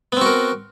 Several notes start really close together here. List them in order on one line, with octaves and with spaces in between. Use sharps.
B3 C4 F#4 A#4